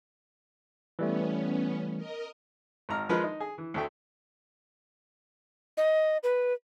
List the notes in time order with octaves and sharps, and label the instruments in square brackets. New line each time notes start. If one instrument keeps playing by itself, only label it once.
[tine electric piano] E3 G3 A3 [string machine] B3 C#4
[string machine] A#4 D#5
[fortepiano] G#1 A#5 F6
F3 G#3 A#4 B4
D#4
G#4
E3
D2 A3 G5
[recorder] D#5
B4